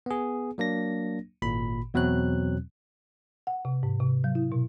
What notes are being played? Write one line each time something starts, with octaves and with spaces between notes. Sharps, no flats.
B3 G#4
F#3 A#3 D4 A#6
G#1 A#2 B5
E2 B2 F#3 C4 F#6
F#5
C3
G#2
C3
F#3
E4
B2